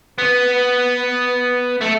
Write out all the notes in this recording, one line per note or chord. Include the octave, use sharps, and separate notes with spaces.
B3
A3